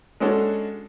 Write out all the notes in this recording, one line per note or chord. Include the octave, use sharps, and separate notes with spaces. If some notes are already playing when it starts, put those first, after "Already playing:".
G#3 C#4 D4 F#4 A4